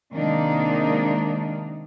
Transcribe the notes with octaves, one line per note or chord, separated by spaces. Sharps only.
C3 D#3 G#3 A#3 D4 D#4